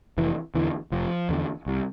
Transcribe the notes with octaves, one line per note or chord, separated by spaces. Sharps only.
F1 E3
E2 D3 E3
F1 F3
E2 D3
C2